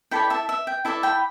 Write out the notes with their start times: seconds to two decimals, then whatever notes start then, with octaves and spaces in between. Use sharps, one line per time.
0.11 E4 A4 D5 G5 B5
0.30 E5 A5
0.49 E5
0.67 G5
0.85 E4 A4 D5 E5 A5
1.03 G5 B5